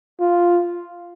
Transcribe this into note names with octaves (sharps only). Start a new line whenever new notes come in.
F4